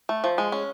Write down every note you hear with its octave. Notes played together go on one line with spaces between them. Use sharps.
A3
F3
G#3
C#4